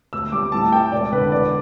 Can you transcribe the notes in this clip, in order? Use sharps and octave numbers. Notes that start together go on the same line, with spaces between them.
D2 E6
G3 D6
A2 A5
E4 G5
E1 D5
D3 B4
E2 D5